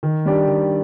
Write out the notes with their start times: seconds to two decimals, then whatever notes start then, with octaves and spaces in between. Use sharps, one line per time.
0.03 D#3
0.26 G3 D4 G4 D5
0.48 D#3